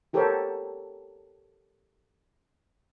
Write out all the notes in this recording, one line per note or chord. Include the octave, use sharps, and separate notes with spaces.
F#4 G4 A4 A#4 C5 C#5